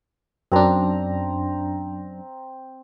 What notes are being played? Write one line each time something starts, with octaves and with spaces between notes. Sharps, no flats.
F#2 C4 D4 A#5